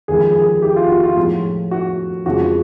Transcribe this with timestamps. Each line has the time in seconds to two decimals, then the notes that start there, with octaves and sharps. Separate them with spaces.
0.08 D#2 D3 F3 G#3 G#4
0.35 G#4
0.62 G4
0.76 F4
0.90 F#4
1.03 F4
1.17 A2 F3 G#3
1.71 F#4
2.26 F2 C#3 F3 G#3 F#4